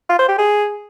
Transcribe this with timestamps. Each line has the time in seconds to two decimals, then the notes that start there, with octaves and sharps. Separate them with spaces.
0.09 F4
0.19 C5
0.29 G4
0.38 G#4